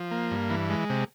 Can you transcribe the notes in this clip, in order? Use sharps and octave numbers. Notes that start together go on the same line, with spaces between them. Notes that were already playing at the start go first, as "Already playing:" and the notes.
Already playing: F3
A#3
G2
E3
G#3
C3